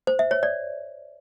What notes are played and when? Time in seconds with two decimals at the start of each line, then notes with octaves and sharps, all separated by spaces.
0.07 C5
0.19 E5
0.31 C#5
0.43 D5